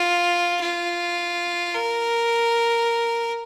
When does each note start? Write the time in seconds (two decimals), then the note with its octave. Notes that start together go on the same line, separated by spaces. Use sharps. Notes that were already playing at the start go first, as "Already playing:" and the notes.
Already playing: F4
0.61 F4
1.75 A#4